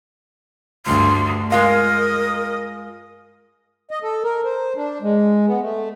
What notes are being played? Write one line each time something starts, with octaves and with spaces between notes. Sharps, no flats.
D2 G2 C6
G#3 F4 A#4 D#5 F5
D#5
A4
A#4
C5
D4
G#3
B3
A3